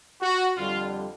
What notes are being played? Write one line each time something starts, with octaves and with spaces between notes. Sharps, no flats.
F#4
F2 D3 G3 F4